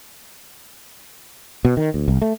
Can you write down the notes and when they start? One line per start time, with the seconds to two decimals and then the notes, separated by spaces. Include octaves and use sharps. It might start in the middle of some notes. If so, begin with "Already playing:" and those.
1.65 B2
1.77 D#3
1.94 D2
2.08 C2
2.22 A3